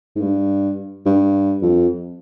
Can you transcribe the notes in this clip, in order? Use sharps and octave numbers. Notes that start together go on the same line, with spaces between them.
G#2
G2
G2
F2